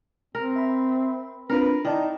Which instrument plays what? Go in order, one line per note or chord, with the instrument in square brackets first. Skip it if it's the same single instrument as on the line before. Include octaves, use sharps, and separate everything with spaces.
[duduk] C4 [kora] A#4
[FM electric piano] E5 B5
[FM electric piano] C4 D4 F4 [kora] A#4 [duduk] B4
[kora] D#3 [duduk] D#4 [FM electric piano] E4 D5 A5